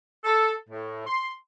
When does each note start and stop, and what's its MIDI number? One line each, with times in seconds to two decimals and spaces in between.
0.24 0.52 69
0.69 1.04 45
1.06 1.30 84